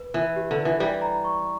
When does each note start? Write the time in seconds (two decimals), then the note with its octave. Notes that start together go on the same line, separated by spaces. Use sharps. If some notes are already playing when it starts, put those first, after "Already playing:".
Already playing: B4
0.14 E3 B4
0.36 G4
0.51 D3
0.58 B4
0.65 E3
0.80 E3 G3 D5
1.01 A#5
1.24 C#6